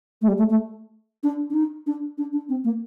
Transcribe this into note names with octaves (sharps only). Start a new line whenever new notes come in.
A3
G3
A3
A3
D4
D4
D#4
D4
D4
D4
C4
A#3